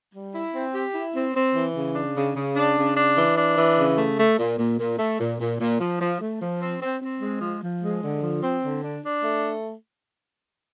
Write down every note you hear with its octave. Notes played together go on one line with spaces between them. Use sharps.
G3
E4
C4
G4
E4
C4
C4
E3
C#3
D4
C#3
C#3
D4
C#3
D4
E3
D4
E3
C#3
A3
A3
A#2
A#2
A#2
A3
A#2
A#2
A#2
F3
F3
A3
F3
C4
C4
C4
G#3
F3
F3
G#3
D3
F3
C4
D3
D4
D4
A3